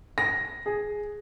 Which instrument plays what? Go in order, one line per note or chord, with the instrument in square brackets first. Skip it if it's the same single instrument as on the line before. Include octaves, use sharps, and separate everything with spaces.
[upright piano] A#6
G#4